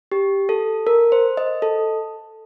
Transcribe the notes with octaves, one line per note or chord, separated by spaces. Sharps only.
G4
A4
A#4
C5
D#5
A4